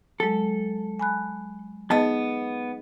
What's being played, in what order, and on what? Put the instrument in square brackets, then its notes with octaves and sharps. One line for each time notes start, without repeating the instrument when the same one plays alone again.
[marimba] F#3 G#3 [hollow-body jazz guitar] A4
[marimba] G#5 B5 F#6
[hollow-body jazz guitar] B3 A5 [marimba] D#4 G#4 D#5